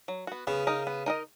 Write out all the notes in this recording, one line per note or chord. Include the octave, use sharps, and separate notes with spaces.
F#3
B3 F#4
C#3 B3
D#4 A#4 D#5
B3
D#4 A#4 D#5